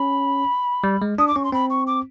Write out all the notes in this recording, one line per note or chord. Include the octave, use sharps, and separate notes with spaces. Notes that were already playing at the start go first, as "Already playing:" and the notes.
Already playing: C#4 B5
G3
G#3
D4 D#6
D6
C#4 C#6
C6
C4 B5
C#6
D6